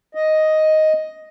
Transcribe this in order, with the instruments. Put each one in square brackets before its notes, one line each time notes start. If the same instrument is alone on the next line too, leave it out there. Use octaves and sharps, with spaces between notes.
[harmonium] D#5